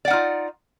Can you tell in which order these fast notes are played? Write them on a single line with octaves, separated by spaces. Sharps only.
D5 F#5 D#4 F4